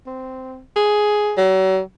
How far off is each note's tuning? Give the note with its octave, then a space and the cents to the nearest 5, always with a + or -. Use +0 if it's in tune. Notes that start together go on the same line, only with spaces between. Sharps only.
C4 -10
G#4 +10
F#3 +40